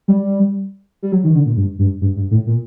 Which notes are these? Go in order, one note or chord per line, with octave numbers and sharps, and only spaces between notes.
G3
G3
F#3
D#3
D3
A#2
G2
G2
G2
G2
A2
A#2